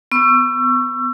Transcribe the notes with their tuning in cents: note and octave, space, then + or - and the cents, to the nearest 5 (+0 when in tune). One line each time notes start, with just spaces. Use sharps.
B3 +15 C#6 +0 E6 +30